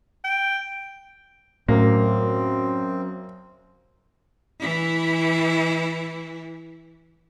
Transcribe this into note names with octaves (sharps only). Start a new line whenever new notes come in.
G5
F#2 A2 A#3 C4
E3 E4